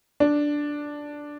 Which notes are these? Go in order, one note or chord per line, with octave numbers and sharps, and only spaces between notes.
D4